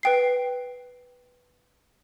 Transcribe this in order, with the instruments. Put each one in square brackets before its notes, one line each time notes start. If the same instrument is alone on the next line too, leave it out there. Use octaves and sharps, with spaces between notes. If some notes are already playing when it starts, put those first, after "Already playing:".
[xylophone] B4 G5 C7